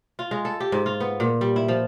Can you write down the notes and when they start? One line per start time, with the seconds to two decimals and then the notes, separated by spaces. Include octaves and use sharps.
0.19 F4
0.31 G#3
0.45 A4
0.60 G4
0.72 G#2
0.86 F4
1.00 B3
1.20 A#2
1.41 G3
1.56 E4
1.68 F3